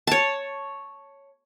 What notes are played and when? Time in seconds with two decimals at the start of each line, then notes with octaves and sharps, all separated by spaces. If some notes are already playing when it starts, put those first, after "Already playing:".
0.07 C#5 A5